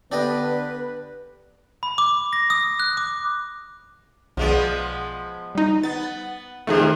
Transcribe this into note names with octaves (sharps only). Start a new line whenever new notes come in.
D3 B3 D4 G4 B4 D#5
B5
D6
A#6
D#6
F#6
D6
B1 F3 G#3 B3 D5
G3 D#4
B3 A6
E2 C3 D#3 A3 D#4 G#4